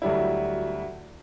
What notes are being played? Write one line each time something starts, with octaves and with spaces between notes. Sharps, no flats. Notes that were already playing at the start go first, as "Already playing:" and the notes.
D2 F#3 G3 E4